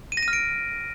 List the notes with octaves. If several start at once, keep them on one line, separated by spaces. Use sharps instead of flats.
D#7
A#6
D#7
F6
D7